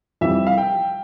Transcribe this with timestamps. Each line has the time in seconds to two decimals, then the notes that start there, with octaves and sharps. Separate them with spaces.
0.21 F2 E3 G3 E5
0.47 F5
0.58 G5